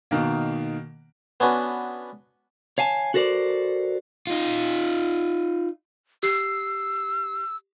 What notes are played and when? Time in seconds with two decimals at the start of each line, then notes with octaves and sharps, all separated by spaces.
0.11 B2 D#3 A#3
1.40 B3 C#4 D4 F#4 B4
2.78 C#5 F5 G#5 A5
3.14 F#4 A4 A#4 C5 D5
4.27 D#4 F4
6.23 G4 E6 C7